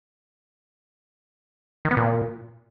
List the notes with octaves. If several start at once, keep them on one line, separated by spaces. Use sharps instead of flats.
D#3
B3
A#2